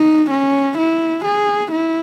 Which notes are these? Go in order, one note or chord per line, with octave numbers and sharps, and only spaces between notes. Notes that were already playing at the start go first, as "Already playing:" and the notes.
Already playing: D#4
C#4
E4
G#4
E4